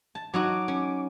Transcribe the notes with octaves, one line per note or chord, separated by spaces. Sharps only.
A5
F#3 D#4 F#4 D6
C#4